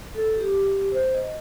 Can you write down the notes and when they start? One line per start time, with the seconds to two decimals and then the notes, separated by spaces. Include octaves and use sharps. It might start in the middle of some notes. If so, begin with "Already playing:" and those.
0.15 A4
0.37 G4
0.92 C5
1.14 D#5